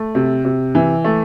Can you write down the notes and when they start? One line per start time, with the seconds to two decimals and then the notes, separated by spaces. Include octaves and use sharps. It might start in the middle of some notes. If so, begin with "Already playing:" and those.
Already playing: A3
0.15 C3
0.45 C3
0.75 E3
1.04 A3